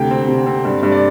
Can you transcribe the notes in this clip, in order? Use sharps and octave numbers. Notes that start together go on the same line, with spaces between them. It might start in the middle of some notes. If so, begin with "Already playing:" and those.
Already playing: D2 C3 G5
C4
C3
C4
G2
G2
D5